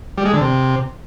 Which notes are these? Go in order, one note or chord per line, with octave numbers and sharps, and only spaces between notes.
G3
G#3
D3
C3